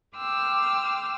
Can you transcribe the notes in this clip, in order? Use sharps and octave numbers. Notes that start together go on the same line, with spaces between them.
G5 C6 D6 E6 F6